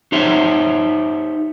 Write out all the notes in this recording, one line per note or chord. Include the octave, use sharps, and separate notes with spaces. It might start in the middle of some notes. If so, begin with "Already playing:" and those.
D#4 G4 C5 C#5 E5